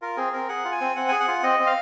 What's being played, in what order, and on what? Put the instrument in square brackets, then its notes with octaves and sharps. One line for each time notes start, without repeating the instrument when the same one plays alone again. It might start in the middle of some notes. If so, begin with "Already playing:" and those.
[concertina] F4 A#4
C4 G#4
C4 A#4
G#4 F#5
F4
G#5
C4
C4 F#5
G#4 G#5
F#5
F4
C4 D#5
C4
F5